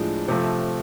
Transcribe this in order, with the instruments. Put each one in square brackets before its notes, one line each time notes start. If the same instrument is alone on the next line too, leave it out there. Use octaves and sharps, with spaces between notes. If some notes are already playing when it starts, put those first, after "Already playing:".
Already playing: [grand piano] A2 G#3 D4 [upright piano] F3
[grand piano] C3 F3 A3